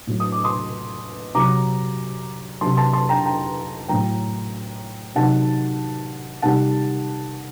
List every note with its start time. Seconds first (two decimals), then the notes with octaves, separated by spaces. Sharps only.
0.07 A2 F#3
0.20 D#6
0.32 D6
0.44 C6 D#6
1.35 C3 F#3 A#5 D6
2.61 C3 F#3 A5 C6
2.77 A5 C6
2.93 A5 C6
3.09 G5 A#5
3.25 G5 A#5
3.88 A2 F#3 G5 A#5
5.15 C3 D#3 F#3 F#5 A5
6.42 C3 D#3 G3 F#5 A5